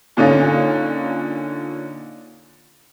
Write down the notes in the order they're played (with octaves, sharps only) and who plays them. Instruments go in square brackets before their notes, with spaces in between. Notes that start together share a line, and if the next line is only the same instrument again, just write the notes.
[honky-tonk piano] A#2 D3 C#4 D#4 F4